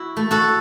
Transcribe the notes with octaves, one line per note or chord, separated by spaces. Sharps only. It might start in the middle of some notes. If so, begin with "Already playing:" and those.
Already playing: E4 F#4
A3
F#4 A4